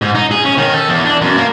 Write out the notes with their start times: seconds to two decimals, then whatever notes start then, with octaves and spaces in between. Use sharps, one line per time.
0.02 G#2
0.15 D#4
0.31 G#4
0.45 C#4
0.58 D#3
0.74 A4
0.89 E2
1.05 D4
1.22 F#2
1.37 A#3